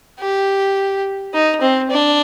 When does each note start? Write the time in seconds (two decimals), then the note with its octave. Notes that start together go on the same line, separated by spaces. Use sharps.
0.20 G4
1.34 D#4
1.61 C4
1.91 D4